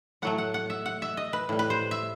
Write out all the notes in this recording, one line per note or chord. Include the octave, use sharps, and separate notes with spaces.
A2 F#3 A3 F#5
F#5
F#5
E5
F#5
E5
D#5
B4
A2 G3
B4
C5
E5